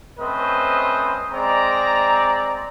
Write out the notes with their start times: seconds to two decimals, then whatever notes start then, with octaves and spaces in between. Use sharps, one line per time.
0.20 A3 C4 C#4 B4 C5 D#5
1.32 G#3 C4 D5 A#5